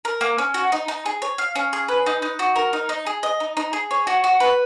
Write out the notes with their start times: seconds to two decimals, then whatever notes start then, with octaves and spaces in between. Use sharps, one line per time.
0.05 A#4
0.21 A#3
0.38 C#4
0.54 F#4
0.72 D#4
0.88 D#4
1.06 G#4
1.22 C#5
1.38 F5
1.55 C#4
1.73 G#4
1.88 B4
2.06 D#4
2.22 D#4
2.39 F#4
2.56 A#4
2.73 D#4
2.89 D#4
3.06 G#4
3.23 D#5
3.40 D#4
3.57 D#4
3.73 G#4
3.91 C#5
4.07 F#4
4.24 F#4
4.40 B4